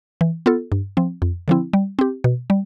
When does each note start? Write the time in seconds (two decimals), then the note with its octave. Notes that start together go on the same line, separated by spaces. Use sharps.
0.21 E3
0.46 B3 F4 A4
0.72 G2
0.97 F3 C4
1.22 F2
1.48 D3 F3 C4 E4
1.73 G3
1.99 C4 G4
2.24 B2
2.50 G3